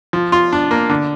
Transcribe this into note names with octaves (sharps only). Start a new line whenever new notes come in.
F3
F4
D4
A#3
D3